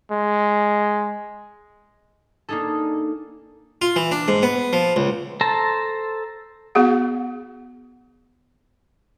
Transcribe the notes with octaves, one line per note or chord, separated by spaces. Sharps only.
G#3
A#3 D4 D#4 G#4 A4
F4
E3
D4
G#2
B3
F3
C#2
A4 C5 A5 A#5
B3 F#4 G#4 F#5